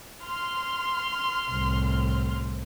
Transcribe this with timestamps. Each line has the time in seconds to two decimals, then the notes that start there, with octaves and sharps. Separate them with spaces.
0.22 C6 F6
1.51 C2 A2